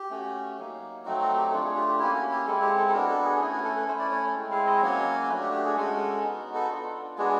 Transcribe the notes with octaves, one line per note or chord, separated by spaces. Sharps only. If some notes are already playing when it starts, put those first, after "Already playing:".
Already playing: G4
A3 C#4 F#4
F#3 A#3 D#4
F#3 A3 C4 D#4 F#4
F#4
G4
A3 D4 F4 A4
G#4
G4
G4
A#3 C#4 E4 G4
F#4
G4
G#3 C4 E4 A4
G4
A4
A4
B3 D4 F#4 A#4
A4
G#4
A3 C#4 E4 G#4
F#4
A4
B4
A3 C#4 E4 C5
D5
C#5
C#5
G#3 C4 E4
F5
D#5
F#3 A#3 C#4 F#4 C#5
A3 D4 F#4 B4
G4
G4
G#4
G#3 C#4 F#4 A4
B3 D#4 F#4
A4
B3 D4 F4
G#3 B3 D4 F#4 G#4